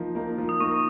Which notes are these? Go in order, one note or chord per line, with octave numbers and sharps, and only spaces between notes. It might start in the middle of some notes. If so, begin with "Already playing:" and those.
Already playing: F3 A#3 D#4
A#3 D#4
F3
D#6
A#3 D#4 C#6
D#6